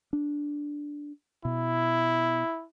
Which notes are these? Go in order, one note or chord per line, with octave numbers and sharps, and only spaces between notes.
D4
B2 E4